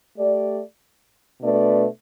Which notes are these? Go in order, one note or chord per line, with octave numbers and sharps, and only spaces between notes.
A3 G4 D5
B2 A3 D4 B4 D5